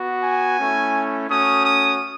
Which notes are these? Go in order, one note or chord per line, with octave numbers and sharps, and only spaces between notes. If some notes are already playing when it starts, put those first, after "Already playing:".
Already playing: B3 F#4
G#5
A3 C#4 E4
A3 C#4 F#4 D#6
D#6